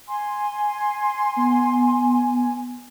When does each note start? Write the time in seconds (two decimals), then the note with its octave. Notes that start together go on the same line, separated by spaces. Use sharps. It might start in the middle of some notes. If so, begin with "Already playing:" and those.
0.08 G#5 C6
1.36 B3